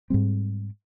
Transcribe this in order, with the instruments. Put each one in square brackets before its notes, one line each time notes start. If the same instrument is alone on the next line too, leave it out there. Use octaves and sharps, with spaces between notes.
[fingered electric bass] G#2 G3 C4